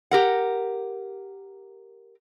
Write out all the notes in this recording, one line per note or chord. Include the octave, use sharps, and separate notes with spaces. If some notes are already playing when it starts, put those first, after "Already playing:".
G4 A#4 F#5